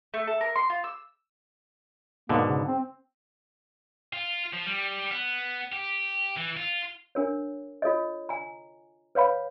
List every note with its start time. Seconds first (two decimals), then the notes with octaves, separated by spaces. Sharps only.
0.14 A3
0.27 A4
0.41 A#4
0.56 C6
0.70 F4
0.84 E6
2.29 G#2 B2 D3 A#3
2.47 C#3
2.66 C4
4.13 F4
4.53 F3
4.66 G3
5.11 B3
5.72 G4
6.37 E3
6.57 F4
7.15 D4 A#4 C#5
7.82 F4 A4 C#5 D#5
8.29 G#5 A#5
9.15 B4 C#5 F5 B5